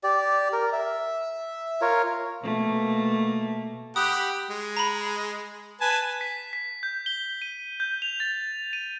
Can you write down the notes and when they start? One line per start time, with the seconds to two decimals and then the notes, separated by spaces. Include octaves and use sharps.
0.03 G4 D5
0.53 A#4
0.73 E5
1.81 F4 A#4 C#5
2.42 B2 A3 A#3
3.96 G4 F#5 B5 D#6
4.50 G#3
4.76 A#5 B5
5.81 B4 G#5 A5
6.21 B6
6.53 B6
6.83 G6
7.06 G7
7.42 D#7
7.80 G6
8.02 F7
8.20 A6
8.73 D#7